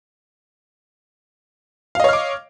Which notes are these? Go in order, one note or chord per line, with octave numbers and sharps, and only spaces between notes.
C#5 D#5 F5 D6 F6